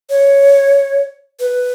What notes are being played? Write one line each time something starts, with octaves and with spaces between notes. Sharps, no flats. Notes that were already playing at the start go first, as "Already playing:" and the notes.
C#5
B4